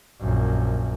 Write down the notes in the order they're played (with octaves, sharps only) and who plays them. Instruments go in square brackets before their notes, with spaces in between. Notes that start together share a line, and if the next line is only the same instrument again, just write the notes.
[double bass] A#1 F#2